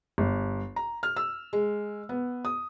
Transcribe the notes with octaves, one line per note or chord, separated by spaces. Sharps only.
G1
A#5
F6
E6
G#3
B3
D#6